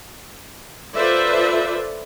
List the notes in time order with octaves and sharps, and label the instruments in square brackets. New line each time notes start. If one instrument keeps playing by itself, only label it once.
[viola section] F4 A4 B4 C5 D5 E5